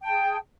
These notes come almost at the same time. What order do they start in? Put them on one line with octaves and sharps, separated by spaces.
G5 A5 G#4